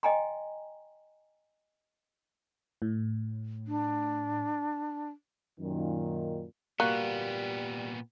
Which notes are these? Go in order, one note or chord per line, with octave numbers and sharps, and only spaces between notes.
D#5 G5 G#5 A#5 C6
A2
D4
F#2 A#2 D#3
A#2 G3 A#3 B3 F#4